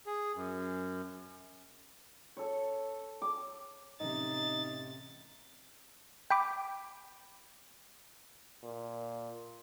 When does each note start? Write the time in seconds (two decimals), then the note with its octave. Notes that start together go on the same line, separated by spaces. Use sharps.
0.06 G#4
0.36 F#2
2.37 A4 C#5
3.22 D6
4.01 A1 C3 D#4 A6
6.30 G5 B5 D6
8.63 A#2